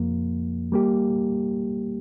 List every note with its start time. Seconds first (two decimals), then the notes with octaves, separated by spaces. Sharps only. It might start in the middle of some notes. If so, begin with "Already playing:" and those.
Already playing: F2 F3 A#3
0.72 G3 A#3 G4